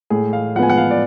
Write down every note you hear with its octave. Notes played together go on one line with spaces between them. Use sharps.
A2 G#4
F5
F3 B3 F#5 G#5
F#5
F5
D5